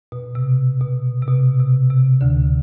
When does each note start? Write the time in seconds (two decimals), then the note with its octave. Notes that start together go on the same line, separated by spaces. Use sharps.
0.12 B2
0.35 C3
0.81 B2
1.23 C3
1.28 B2
1.59 C3
1.90 C3
2.21 D2 D3